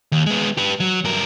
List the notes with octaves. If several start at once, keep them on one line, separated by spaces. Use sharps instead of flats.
D#2
G#3 B3
G4 B4
F#3
G2 A#4